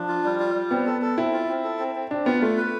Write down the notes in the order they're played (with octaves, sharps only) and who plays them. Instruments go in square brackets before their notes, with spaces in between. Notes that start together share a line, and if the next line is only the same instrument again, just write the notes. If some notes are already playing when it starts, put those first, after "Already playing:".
Already playing: [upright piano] F3 [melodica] D4
[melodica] F4
G3
F4
G3
[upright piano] B3 [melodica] C4
[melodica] A4
A4
[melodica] C4 [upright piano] E4
[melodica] F4
C4
A4
C4
C4
[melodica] C4 [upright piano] D4
[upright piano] B3 [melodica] F4
[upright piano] A3 [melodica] F4
[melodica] B4